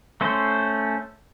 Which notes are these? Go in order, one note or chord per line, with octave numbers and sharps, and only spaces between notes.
A3 C#4 C5